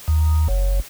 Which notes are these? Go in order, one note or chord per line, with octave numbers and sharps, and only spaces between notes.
D#2
F#1